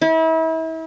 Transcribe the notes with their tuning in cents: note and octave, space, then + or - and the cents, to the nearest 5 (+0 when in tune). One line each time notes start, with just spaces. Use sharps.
E4 -35